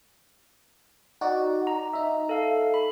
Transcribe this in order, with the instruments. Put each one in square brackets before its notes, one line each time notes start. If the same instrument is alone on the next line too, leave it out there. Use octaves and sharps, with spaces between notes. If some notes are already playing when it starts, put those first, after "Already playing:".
[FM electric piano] D#4 F#4 D5
[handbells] A#5
[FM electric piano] D#4 E5
[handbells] A4 F5
B5